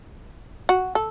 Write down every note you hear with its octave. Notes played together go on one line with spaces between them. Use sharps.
F#4
A4